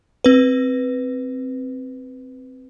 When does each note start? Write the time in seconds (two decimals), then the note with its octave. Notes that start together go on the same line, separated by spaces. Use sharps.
0.24 C4 B4